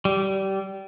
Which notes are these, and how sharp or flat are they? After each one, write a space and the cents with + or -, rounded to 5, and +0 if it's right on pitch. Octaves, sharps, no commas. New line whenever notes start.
G3 -20